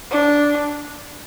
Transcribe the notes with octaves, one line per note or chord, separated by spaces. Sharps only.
D4